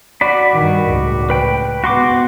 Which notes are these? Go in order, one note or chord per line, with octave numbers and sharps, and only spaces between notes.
F#4 D5 B5
G2 D#3
C#2 A2
B4 G5
G#2 B3 F#4 C6 D6